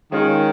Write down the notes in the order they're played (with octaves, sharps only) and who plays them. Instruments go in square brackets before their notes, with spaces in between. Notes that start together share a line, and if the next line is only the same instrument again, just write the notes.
[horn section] D#3 [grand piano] G#3 C#4 F4 G#4 C#5